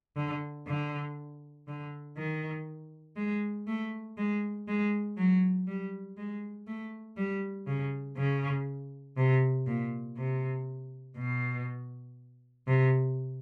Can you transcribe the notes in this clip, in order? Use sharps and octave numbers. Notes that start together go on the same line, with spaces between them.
D3
D3
D3
D#3
G#3
A3
G#3
G#3
F#3
G3
G#3
A3
G3
C#3
C#3
C3
A#2
C3
B2
C3